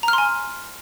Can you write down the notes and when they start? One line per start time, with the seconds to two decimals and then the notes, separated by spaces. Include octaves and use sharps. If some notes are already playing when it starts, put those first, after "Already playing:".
0.03 A#5
0.08 F6
0.13 C6
0.18 G#5